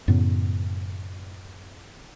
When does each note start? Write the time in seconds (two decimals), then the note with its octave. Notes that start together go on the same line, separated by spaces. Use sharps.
0.08 F#2 A2 C#3 B3